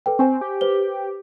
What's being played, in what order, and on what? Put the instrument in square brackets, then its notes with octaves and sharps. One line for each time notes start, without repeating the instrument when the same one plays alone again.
[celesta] A4 B4 G5
[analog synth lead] C4 [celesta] C5 G#5 C#6
[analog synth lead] G4
[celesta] B4 C5 G7